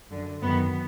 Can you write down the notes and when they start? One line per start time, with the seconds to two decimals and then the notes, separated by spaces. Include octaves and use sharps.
0.10 F#2 D3
0.42 F#2 D#3 B3